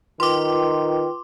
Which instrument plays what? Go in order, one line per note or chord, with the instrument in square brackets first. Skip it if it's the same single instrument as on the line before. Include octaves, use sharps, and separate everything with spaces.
[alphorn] D#3 [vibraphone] F4 B4 G5 [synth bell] C6 D6